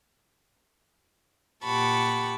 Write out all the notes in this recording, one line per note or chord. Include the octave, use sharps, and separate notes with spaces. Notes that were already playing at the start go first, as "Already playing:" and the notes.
A#2 G4 F#5 A5 B5 C#6